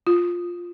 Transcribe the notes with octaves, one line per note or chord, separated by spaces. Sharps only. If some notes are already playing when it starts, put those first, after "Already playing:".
F4